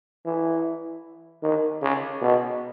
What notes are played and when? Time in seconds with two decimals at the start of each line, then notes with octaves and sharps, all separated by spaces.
0.25 E3
1.43 D#3
1.82 C#3
2.22 B2